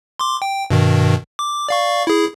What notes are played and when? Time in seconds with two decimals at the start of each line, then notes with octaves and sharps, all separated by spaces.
0.19 C6 D6
0.42 G5
0.70 G2 B2 D#3
1.39 D6
1.69 D5 F5 C#6
2.07 E4 G#4